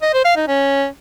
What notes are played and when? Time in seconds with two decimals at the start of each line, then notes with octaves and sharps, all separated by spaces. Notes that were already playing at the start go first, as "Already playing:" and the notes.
0.02 D#5
0.13 C5
0.25 F5
0.36 D#4
0.48 C#4